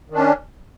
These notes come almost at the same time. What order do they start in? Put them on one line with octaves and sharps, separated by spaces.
D#3 D4 C#4